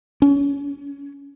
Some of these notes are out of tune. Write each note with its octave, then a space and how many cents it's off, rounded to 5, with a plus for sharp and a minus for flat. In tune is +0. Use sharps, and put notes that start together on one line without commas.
C#4 +25